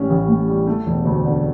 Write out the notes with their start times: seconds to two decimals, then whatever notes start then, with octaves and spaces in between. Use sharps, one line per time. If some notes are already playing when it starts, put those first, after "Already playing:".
Already playing: A1 A2 G3 C#4
0.10 A1
0.28 A2
0.48 G3
0.67 A3
0.86 E1
1.05 D2
1.25 D3